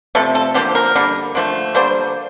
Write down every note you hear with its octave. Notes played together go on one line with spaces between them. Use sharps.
C3 F3 A3 A4
A4
D3 F3 A#3 G4
A#4
D3 G3 A#3
D3 F3 A3
D3 G3 A#3 C5